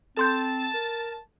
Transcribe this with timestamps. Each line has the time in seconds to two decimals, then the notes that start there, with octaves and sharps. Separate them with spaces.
0.17 C4 A4 A5 C6 G6
0.74 A#4